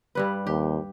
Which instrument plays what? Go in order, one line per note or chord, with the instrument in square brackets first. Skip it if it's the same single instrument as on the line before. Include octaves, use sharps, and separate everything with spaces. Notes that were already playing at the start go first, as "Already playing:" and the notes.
[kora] G2 G3 B4
[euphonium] D#2 [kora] G4